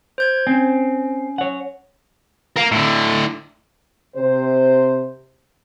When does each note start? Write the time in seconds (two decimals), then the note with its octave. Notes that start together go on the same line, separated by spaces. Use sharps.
0.18 C5 G6 G#6
0.47 C4 C#4
1.38 C#5 F#5
2.56 A#4 F5
2.72 A2 D3
4.16 C3 C5